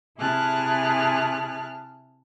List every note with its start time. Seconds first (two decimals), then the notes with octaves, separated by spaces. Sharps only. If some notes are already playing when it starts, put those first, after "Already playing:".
0.18 C3 E4 G#4 A5 F6 F#6